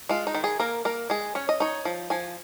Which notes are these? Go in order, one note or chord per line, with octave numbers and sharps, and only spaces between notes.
G#3 F4
D#4
D#3
G#4
A#3 A#4
A#3 A#4
G#3 G#4
C#4 C#5
D#5
D#4 C#5
F3
F3 G#5